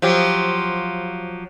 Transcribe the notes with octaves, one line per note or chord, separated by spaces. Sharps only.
F3 F#3 G4